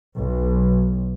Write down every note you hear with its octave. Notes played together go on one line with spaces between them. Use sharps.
B1